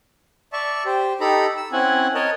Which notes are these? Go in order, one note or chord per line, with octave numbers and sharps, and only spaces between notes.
D5 E5 A5 C#6
G4 C5
D#4 G4 A4 A#5 B5
E6
C4 C#4 E4 F#5 G#5
A#4 C#5 D#5 A5